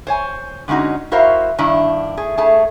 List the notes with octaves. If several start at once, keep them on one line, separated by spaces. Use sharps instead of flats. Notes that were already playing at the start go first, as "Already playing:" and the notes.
C5 C#5 G#5
D3 G#3 C#4 D#4 F#4
E4 F#4 A#4 C5 E5 F5
G2 D#3 D4 E4
A3 G#4
A3 G#4 C#5 A5